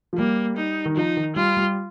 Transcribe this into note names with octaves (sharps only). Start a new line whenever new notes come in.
F3
G3 A#3
D#4
D#3
F3 D#4
D#3
G3 F4
G3